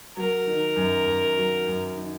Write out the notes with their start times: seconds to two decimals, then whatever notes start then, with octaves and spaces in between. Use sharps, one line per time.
0.17 F#3 A#4
0.47 D#3
0.76 F#2
1.06 F#2
1.37 F#3
1.66 F#2
1.96 D#3